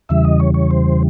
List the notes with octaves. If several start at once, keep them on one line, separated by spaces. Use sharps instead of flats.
E2 C#3 E3 G3 E5
D#5
C#5
C#5
C5